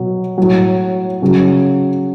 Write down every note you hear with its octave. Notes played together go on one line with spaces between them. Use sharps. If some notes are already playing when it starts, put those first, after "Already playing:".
Already playing: B2 F#3
A2 F#3
C#3 F#3